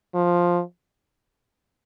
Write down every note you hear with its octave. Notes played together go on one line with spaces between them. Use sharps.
F3